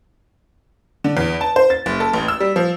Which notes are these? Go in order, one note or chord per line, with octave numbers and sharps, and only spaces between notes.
D3
E2
A5
C5
A6
F#1
A4
A1
E6
G3
F3